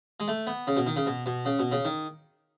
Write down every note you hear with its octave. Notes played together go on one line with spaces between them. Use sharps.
G#3
A3
B3
C#3
B2
D#3
C#3
B2
B2
C#3
B2
C#3
D#3